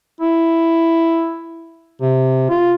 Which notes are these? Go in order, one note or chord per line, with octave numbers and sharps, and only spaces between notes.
E4
C3
F4